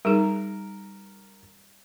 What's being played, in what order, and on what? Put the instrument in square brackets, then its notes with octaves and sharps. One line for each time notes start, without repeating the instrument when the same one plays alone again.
[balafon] G3 D#4 G#4 [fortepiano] A#4